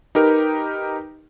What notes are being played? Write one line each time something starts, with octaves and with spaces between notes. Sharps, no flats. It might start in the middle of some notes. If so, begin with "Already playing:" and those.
D#4 G4 A#4 B4